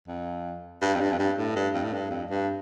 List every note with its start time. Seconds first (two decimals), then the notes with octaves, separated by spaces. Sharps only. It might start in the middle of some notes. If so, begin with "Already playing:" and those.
0.07 F2
0.82 G2
0.94 F2
1.00 G2
1.12 F2
1.19 G2
1.38 A2
1.56 G2
1.74 F2
1.83 A2
1.93 G2
2.11 F2
2.30 G2